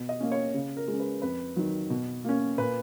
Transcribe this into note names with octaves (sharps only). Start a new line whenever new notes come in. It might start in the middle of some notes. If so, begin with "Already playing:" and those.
Already playing: B2
D#5
A#3 C#4
C#5
C#3
A#4
G#3
C#4
B4
F2 B4
D#3 F#3
B2
A#3 C#4
A#2 B4